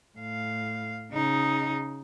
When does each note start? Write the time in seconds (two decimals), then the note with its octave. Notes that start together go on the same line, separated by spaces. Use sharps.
0.18 A2 F5
1.13 C#3 D#4